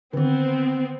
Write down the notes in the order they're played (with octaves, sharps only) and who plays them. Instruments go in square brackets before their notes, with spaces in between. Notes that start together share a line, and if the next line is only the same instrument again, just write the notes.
[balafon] D3 D#3 [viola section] B3 C4